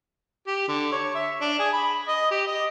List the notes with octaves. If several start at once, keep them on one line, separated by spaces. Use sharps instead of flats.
G4
D3
C#5
E5
D4
G#4
B5
D#5
G4
D#5